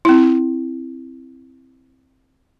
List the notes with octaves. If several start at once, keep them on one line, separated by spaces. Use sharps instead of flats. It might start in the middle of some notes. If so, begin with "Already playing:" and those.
C4 E4